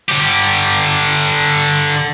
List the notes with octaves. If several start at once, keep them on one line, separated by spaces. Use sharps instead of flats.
D3 G4